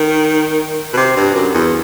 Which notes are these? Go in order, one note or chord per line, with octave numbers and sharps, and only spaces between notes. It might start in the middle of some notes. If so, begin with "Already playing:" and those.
Already playing: D#3
B2
C3
G2
F#2
E2